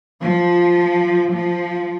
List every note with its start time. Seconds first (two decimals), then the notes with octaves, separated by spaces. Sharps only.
0.21 F3
1.31 F3